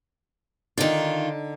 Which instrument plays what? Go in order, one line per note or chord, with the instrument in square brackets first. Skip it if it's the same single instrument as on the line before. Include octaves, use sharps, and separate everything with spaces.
[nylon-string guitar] D3 D#4 [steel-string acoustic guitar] D#3 F4